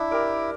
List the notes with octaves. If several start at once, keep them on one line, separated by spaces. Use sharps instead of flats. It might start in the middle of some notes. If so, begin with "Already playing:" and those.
Already playing: D4 E4
G4 A#4 D5